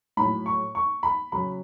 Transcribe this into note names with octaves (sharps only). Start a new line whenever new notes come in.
A2 F#3 B5
C#6
C#6
B5
C#3 F#3 B5